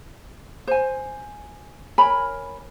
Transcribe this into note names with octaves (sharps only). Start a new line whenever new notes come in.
C5 G#5
A#4 C#5 G#5 B5